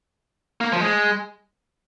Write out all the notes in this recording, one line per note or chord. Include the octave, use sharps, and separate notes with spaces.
A#3
F3
G#3